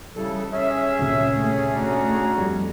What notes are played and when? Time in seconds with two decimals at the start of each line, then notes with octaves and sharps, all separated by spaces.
0.16 C#3 E3 G3 A4
0.52 C#4 G#4 E5
0.98 D#1 C#2 C3
1.35 A3
1.74 D4 F#4 A#5
2.38 F2 G3